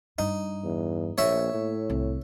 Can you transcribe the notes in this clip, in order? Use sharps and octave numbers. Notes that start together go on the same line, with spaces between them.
G2 D#4
E2
A#1 A#3 C#5 E5
A2
C2